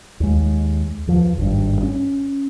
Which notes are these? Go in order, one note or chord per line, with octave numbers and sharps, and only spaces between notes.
D#2 G#3
E2 F3
G#1 G2
C#4